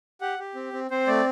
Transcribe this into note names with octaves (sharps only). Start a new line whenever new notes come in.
G4 F#5
G4
C4
C4
C4 C5
A3 D5